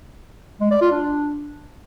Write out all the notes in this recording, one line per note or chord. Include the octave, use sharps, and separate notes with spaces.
G#3
D5
F4
D4